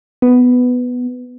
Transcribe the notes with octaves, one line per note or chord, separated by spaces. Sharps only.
B3